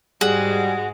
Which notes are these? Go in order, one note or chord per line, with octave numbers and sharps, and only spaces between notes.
G#2 G3 G#3 F#4 G#4